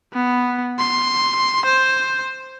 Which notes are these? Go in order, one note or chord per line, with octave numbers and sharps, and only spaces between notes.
B3
C6
C5